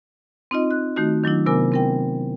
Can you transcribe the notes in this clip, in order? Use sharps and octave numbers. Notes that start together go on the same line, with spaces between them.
C4 D#4 F4 D#5
F#6
D#3 A3 D#4 F#4
D#3 F#3 D4 E4
C3 B3 A#4 G#5 D6
C4 A#4 G5